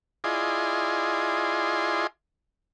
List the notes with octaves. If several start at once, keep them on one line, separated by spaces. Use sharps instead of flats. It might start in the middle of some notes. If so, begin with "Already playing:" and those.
E4 F4 G#4 D5 D#5 C6